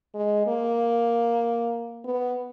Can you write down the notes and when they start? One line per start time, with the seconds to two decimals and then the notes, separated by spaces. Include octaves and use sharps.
0.15 G#3
0.47 A#3
2.04 B3